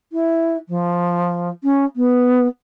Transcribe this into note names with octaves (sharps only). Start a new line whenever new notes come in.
E4
F3
C#4
B3